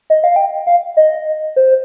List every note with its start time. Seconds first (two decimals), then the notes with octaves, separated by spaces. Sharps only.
0.10 D#5
0.24 F5
0.36 G5
0.67 F5
0.97 D#5
1.56 C5